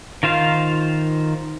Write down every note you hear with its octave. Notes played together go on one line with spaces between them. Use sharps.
D#3 F4 C5 F5